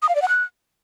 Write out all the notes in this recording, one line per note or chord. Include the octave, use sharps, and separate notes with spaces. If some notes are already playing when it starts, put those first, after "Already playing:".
D#6
F5
D5
F#5
F#6